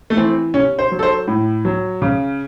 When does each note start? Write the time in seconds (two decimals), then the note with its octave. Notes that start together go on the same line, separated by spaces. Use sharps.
0.10 A3
0.17 E3 C4
0.54 C3 C#4
0.79 C5
0.92 F#3
0.99 A4
1.03 C5
1.28 A2
1.65 F#3
2.02 C#3